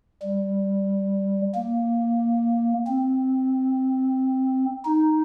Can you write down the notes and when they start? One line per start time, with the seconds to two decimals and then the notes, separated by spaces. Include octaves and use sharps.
0.22 G3
1.54 A#3
2.87 C4
4.85 D#4